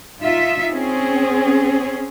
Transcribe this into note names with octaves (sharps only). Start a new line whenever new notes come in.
D#4 F4 E5
C4 C#4 G#4